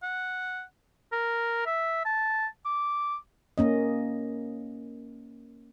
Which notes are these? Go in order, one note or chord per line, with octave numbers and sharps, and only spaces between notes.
F#5
A#4
E5
A5
D6
A#3 C#4 D#5